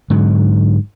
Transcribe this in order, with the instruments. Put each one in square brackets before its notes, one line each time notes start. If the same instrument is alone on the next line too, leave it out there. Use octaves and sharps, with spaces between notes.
[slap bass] G#2 D3 F#3